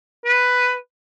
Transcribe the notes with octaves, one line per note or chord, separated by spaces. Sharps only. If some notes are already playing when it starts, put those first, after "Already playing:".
B4